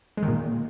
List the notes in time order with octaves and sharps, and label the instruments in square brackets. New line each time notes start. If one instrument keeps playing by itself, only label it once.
[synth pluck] G#3
D#3
A#2